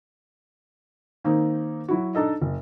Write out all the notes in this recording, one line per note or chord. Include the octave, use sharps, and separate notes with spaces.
D#3 A#3 C4 D#4
F#3 E4 F#4
D4 D#4 A4 D#5
F#1